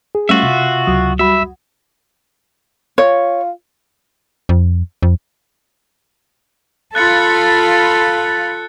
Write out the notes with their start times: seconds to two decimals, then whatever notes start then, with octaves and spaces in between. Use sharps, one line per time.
0.15 G#4
0.29 G3 A3 C#4 F4 F#4 E5
0.43 C3
0.87 C#2 F#3 D#6
1.19 G3 F#4 E5 B5
2.98 F4 C#5
4.49 F2
5.03 F2
6.95 F4 A4 B5 F#6 A6 C#7